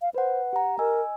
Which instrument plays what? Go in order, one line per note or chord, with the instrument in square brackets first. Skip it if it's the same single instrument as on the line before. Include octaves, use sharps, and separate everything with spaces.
[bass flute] F5
[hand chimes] B4 F#5 [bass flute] C5
[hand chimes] G4 A#5 [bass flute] F#5
[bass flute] A#4 [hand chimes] D#5 G#5 E6